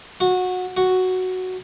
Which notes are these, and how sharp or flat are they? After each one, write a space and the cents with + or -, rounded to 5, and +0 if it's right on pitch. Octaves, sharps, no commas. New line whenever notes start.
F#4 -20
F#4 +0